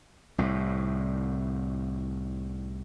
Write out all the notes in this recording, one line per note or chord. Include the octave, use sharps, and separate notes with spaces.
C2 A2